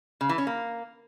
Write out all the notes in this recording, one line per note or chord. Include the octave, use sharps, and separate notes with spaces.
C#3
E3
C#4
A#3